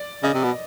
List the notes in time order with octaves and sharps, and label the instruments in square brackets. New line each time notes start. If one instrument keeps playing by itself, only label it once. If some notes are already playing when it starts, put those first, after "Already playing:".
Already playing: [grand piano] D5
[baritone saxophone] C#3 [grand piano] D#5
[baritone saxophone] C3
B2